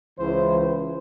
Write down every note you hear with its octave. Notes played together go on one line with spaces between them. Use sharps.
C#2 E3 E4 C5